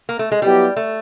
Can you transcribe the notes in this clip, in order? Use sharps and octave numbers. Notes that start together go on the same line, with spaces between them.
A#3
A3
G#3
F#3 G3 B3 E4 G4
A3